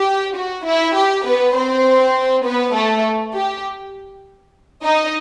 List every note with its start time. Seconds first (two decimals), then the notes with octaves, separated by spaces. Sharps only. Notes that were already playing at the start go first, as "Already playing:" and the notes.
Already playing: G4
0.35 F#4
0.65 E4
0.95 G4
1.25 B3 B4
1.55 C4 C5
2.44 B3 B4
2.74 A3 A4
3.34 G4
4.83 D#4 D#5